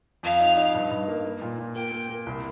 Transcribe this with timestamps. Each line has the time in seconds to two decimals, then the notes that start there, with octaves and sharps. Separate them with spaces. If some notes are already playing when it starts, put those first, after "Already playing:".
0.23 F2 F5
0.40 D#4
0.57 D#4
0.75 G2
0.91 G2
1.08 A#3
1.24 A#3
1.42 A#2
1.59 A#2
1.75 A#3 G5
1.92 A#3
2.10 A#3
2.26 C2